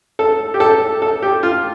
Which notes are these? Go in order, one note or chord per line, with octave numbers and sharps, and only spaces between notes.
A4
G4
A4
A4
G4
F4